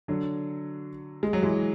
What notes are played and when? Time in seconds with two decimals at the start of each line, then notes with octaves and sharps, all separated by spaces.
0.08 D3 F#3
1.23 G#3
1.33 F#3
1.42 E3 G#3